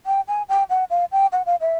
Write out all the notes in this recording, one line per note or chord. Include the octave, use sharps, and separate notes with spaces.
G5
G#5
G5
F#5
F5
G5
F#5
F5
E5